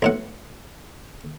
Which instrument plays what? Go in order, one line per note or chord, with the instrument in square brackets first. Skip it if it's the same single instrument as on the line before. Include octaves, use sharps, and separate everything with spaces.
[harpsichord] B1 A2 F#5